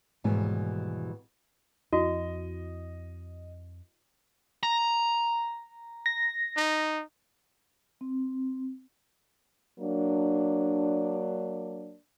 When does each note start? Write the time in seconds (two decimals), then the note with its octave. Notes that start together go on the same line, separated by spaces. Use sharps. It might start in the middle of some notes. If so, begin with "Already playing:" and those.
0.24 D#2 G#2 B2 E3 G3 G#5
1.93 F2 E4 F#4 D#5
4.63 A#5
6.06 A#6
6.57 D#4
8.01 C4
9.80 F#3 A#3 D4